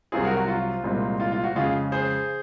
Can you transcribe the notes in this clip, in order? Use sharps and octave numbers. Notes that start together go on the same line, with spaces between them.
C2 C3 F#3 C4 F4 G#4
F#4 A#4
F#4
F4
C2 A#2 G#3 C4
F4
F4
F#4
F2 C#3 G#3 F4 G#4
G#4 C5